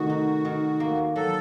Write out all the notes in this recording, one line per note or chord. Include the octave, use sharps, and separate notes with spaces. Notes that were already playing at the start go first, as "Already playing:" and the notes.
Already playing: C3 D#3 A3 F#4
D#4
D#3
A#3
F#3 A4